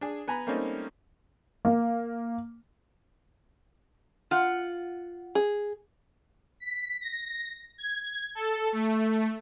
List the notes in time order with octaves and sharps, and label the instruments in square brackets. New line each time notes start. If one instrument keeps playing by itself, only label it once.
[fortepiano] D4 G#4
B3 B4 G#5 A#5 B5
G3 A3 A#3 C4 C#4 D#4
[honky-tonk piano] A#3
[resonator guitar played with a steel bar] F4 F#5
[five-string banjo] G#4
[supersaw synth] B6
A#6
G#6
A4
A3